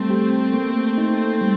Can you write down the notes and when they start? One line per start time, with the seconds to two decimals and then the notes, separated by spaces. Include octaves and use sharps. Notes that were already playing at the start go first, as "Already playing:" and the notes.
Already playing: G3 A3 C4
0.10 G4
0.54 A#3
0.98 D#4
1.41 G3